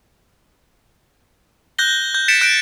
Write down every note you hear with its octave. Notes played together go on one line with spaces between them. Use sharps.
F#6 G6 A#6 G7
G6
A6 B6 C#7 D7 E7
F#6 G6 D7